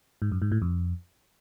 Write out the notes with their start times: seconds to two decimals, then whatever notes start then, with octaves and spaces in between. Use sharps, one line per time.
0.22 G#2
0.32 F#2
0.42 G#2
0.52 A2
0.62 F2